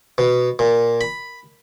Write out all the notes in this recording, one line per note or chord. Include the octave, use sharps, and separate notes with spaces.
B2
A#2
B5